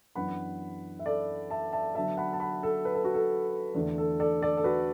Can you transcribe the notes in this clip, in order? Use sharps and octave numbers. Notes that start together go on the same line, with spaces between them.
F#2 E3 B3 D4 F#5 B5
E5
A4 D5
E5 A5
E5 A5
D3 F#3 B3 E5 A5
F#5 B5
A5
F#5 B5
A4
B4
A4
F#4
A4
E2 D3 A3 D4
A4
A4 D5
A4 D5
A4
F#4 B4